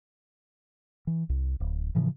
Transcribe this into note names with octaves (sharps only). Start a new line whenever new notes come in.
E3
C2
D1
A2 C#3 E3 F3